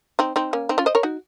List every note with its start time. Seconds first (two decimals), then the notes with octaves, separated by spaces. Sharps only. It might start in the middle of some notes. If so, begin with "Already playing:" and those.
0.19 C4 D#4
0.36 C4 D#4
0.53 A#3 C#4
0.69 C4 D#4
0.78 C#4 F4
0.86 C5 D#5
0.95 A#4 C#5
1.03 D#4 F#4